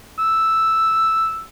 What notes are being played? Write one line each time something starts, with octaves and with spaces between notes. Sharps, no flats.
E6